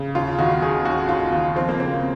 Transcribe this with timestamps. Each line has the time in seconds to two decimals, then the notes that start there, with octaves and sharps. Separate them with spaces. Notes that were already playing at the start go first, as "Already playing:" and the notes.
Already playing: C#3
0.15 D#2 F4
0.38 D#3 F#4
0.62 D#3 G#4
0.85 D#2 F#4
1.09 D#2 F4
1.33 D#3
1.56 F3 C4
1.69 A#3
1.80 C#3 C4